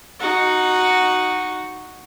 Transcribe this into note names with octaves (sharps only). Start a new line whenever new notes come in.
D#4 F#4